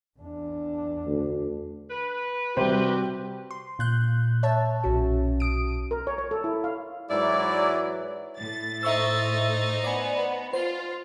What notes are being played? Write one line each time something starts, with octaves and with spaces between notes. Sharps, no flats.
E2 D4
D2
B4
C3 G3 F#4 G4 C5
C6
A#2 F#6 G6
C#5 E5 A5
B1 C#4 F#4
D#6 D7
A#4
C#5
C#5
A4
E4
F5
G#2 E3 F#3 E4 D5
A2 A6
D#4 C5 E5 C#6 E6
B3 D5 G#5
F4 C5